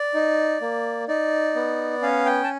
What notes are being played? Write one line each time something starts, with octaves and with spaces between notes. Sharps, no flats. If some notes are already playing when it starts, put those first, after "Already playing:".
Already playing: D5
D#4
A#3
D#4 D5
B3
C#4 F5
G5
A5